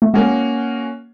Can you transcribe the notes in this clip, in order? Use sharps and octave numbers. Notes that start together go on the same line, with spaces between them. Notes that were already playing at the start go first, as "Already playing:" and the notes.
A3
G#3 A#3 C#4 F#4